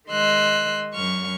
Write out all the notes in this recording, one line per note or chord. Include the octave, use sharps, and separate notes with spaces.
D#3 G#3 D#5 C6 E6 F#6
F#2 C#6 F6